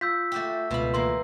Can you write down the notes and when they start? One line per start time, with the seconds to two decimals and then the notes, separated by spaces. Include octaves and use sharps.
0.01 F4 E6 G6 B6
0.32 A3 F#4 G4
0.71 C#2 B2 A3 F4 B5
0.94 E3 A#3 C6